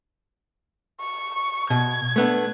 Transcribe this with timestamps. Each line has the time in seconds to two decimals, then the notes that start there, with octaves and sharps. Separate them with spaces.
1.01 C#6
1.70 B2 G#6
2.16 A3 B3 D4